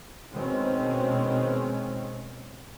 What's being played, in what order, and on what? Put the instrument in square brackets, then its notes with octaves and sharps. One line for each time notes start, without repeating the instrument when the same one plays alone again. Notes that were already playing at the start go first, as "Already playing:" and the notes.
[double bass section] B2 D#3 G#3 C4 C#4